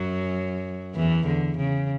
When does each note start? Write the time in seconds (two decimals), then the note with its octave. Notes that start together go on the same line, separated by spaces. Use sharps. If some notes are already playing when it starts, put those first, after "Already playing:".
Already playing: F#2 F#3
0.95 E2 E3
1.26 D3
1.57 C#3